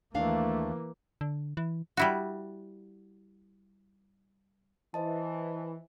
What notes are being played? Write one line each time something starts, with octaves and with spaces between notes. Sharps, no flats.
D#2 E3 A3 A#3 D4 F5
D3
E3
G3 E4 F#4
E3 C5 D#5 A5